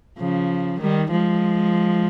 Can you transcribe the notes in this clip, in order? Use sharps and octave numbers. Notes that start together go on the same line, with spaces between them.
C#3 F3
D#3 G3
F3 G#3